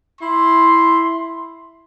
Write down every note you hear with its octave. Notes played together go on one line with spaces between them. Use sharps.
E4 C6